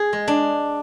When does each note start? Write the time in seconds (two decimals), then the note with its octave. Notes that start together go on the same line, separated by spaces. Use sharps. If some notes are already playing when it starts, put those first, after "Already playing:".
Already playing: G#4
0.13 G#3
0.28 D4